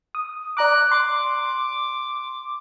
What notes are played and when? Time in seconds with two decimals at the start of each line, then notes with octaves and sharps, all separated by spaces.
0.15 D#6
0.57 D5 A#5 D6 F#6
0.91 C6 D6